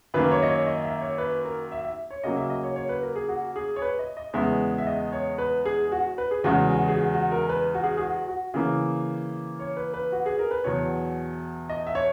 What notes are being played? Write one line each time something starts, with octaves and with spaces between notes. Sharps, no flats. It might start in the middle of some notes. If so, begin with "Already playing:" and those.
F#2 D#3 A#3 B4
C#5
D#5
C#5
D#5
E5
C#5
B4
A#4
E5
E5
C#5
C#3 F#3 A#3 D#5
E5
D#5
C#5
C#5
B4
A#4
G#4
F#4
G#4
C#5
B4
D#5
D#5
E2 C#3 G#3 B3 E5
E5
D#5
C#5
B4
G#4
F#4
B4
G#4
E2 C#3 G#3 F#4
F#4
G#4
F#4
F#4
A#4
B4
F#4
G#4
G#4
F#4
F#4
C#3 E3 A#3
C#5
B4
B4
F#4
G#4
A#4
B4
E2 B2 F#3 C#5
D#5
E5
C#5